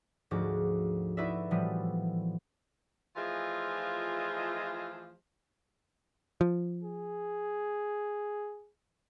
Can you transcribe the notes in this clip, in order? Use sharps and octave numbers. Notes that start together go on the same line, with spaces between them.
D2 G#2 F3 F#4 D6
D#4 E4 F#4 B4 D5 E5
A2 E3 F3 G3 B3
E3 F3 A3 F4 G#4 D#5
F3
G#4